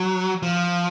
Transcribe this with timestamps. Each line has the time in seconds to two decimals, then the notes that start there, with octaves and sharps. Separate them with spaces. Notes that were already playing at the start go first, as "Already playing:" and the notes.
Already playing: F#3
0.43 F3